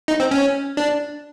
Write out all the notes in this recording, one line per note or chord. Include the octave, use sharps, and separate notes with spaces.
D#4
C4
C#4
D4